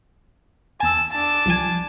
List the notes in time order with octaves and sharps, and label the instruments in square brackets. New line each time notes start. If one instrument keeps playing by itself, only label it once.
[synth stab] E2 G#5 [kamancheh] A5 E6
[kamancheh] D4 A5
[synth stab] C2 F3 G#5